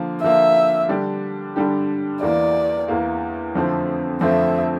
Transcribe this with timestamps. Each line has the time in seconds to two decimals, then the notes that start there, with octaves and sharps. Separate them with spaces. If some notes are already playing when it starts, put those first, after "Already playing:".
Already playing: D3 F3 A#3
0.22 D3 F3 A#3 E5
0.89 D3 G3 D4 G4
1.56 D3 G3 D4 G4
2.22 E2 E3 A#3 D5
2.88 E2 E3 A#3
3.55 F2 D3 F3 A3 C4
4.21 F2 D3 F3 A3 C4 E5